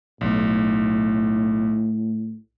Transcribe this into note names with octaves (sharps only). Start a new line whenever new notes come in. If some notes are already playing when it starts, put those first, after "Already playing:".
B1 A2